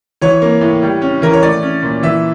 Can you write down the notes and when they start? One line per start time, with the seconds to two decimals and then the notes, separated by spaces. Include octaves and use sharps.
0.21 E3 C#5
0.42 A#3
0.61 A2
0.82 G3
1.02 C#4
1.22 E3 A#4
1.33 C#5
1.43 A3 D5
1.62 C#4
1.83 A#2
2.03 E3 E5